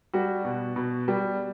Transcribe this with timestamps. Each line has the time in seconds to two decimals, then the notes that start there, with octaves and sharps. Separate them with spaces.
0.14 G3 F#4
0.45 B2
0.76 B2
1.08 G3